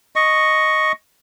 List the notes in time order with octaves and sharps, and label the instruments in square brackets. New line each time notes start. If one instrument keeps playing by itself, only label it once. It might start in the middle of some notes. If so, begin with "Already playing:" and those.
[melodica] D#5 C#6